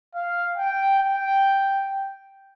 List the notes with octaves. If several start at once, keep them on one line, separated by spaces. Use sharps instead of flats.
F5
G5
G5